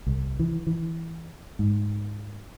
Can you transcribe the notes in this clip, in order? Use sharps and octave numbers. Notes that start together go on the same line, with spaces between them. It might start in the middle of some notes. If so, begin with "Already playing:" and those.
C2
E3
E3
G#2